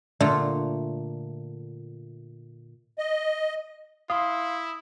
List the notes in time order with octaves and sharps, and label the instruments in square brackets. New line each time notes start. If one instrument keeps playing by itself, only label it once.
[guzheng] A#2 D3 A3 F4
[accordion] D#5
[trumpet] E4 [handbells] F5 C6 [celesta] D#6